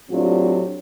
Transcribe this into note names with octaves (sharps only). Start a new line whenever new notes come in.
A2 F#3 C4 D4 F4 G4